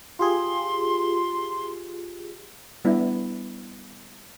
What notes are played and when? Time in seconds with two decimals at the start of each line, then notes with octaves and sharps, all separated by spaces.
0.19 F4 G4 G#4 C6
2.85 G3 B3 D4 E4